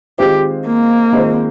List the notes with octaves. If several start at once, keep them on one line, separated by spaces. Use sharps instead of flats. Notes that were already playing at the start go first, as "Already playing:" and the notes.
D#3 G#3 C4 F4 G4 C5
A#3
D#3 G#3 C4 F4 C5